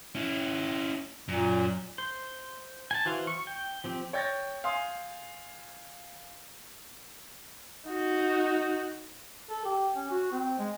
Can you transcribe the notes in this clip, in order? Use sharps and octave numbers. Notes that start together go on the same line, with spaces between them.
C#4 E4
F#2 A#2
C5
G#5 A5
E3 F#4 C5 F5
C#6
G5
F3 C4 G4
C#5 G5 G6 A6 A#6
F5 G#5 C6 D#6
D#4 F#4
A4
G4
C#4
F#4
C4
G#3